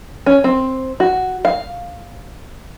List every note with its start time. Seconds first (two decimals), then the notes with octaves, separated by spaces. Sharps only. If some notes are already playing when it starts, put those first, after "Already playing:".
0.26 C#4
0.44 C4
1.00 F#4
1.45 F5